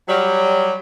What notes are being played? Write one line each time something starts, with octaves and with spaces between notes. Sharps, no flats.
F#3 G3